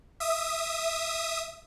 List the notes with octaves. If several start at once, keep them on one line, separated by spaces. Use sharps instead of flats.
E5 D#6